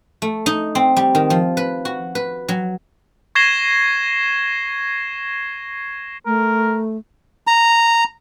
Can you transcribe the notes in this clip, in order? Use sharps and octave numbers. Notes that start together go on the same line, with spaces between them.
A3
D#4
C4
G3
D#3
F3
B4
F#4
B4
F#3
C#6 G#6 A#6 C7 E7 G7
A3 A#4
A#5